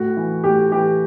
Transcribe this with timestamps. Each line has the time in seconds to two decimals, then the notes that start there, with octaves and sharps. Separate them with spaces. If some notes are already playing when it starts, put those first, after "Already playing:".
Already playing: A2 F#4
0.17 E3
0.44 A2 G4
0.72 E3 G4